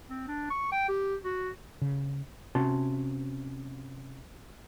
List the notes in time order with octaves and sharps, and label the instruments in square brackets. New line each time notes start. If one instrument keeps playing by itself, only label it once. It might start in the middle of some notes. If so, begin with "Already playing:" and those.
[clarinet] C4
D4
C#6
G5
G4
F#4
[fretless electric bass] C#3
[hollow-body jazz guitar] C3 C#4 F#4 A5 C6